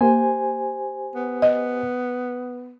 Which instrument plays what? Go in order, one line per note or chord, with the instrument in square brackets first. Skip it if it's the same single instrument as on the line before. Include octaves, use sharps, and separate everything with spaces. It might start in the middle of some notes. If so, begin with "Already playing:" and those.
[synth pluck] A#3 [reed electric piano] G4 C5 G#5
[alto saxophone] B3
[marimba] D#5